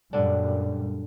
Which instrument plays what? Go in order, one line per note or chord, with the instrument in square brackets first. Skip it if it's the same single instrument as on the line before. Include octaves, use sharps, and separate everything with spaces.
[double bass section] F#2 A#2 G3 [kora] D3 D4